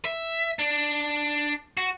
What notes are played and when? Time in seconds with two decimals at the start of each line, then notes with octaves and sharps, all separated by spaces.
0.05 E5
0.59 D4
1.77 F#4